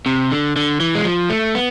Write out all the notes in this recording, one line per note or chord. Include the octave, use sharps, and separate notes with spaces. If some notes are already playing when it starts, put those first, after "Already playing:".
C3
D3
D3
E3
G#3
F3
A3
B3